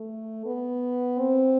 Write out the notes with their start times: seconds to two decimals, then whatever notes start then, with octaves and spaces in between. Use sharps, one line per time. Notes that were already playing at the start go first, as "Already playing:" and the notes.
Already playing: A3
0.46 B3
1.19 C4